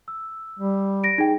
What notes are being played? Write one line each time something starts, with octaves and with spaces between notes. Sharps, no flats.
E6
G3
A#6 D7
D#4 G#4 G5